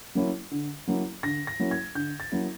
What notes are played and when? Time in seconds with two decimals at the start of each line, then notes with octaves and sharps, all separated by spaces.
0.15 F#3 A#3 C#4 E4
0.51 D3
0.88 F#3 A#3 C#4 E4
1.23 D3 A#6
1.47 A#6
1.60 F#3 A#3 C#4 E4
1.71 G#6
1.95 D3 G6
2.20 A6
2.32 F#3 A#3 C#4 E4